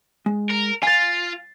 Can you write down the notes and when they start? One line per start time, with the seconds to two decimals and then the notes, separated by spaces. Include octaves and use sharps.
0.26 G#3
0.51 A#4
0.83 F4 G#5 A6 C7